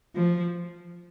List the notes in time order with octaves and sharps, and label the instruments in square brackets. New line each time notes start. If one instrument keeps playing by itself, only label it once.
[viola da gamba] F3